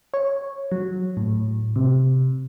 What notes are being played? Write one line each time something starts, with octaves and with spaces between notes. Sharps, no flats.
C#5
F#3
A2
C3